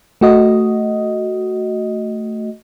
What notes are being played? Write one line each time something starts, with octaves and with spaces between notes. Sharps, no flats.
A3 F#4 D#5